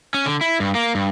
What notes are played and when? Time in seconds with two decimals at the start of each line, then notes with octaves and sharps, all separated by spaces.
0.14 C#4
0.26 D3
0.41 E4
0.60 G2
0.75 A#3
0.95 G2